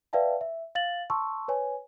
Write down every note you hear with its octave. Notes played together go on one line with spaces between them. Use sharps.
B4 D5 E5 F5 G5 A5
E5
F5 A6 F#7
A5 C6 C#6 E6
B4 C#5 G#5